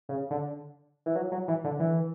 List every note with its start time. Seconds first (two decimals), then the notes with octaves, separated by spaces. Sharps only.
0.09 C#3
0.31 D3
1.06 E3
1.16 F#3
1.32 F#3
1.48 E3
1.64 D3
1.80 E3